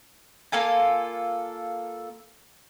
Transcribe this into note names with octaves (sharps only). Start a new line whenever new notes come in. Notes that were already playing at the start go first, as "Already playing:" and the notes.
A#3 F4 A4 G#5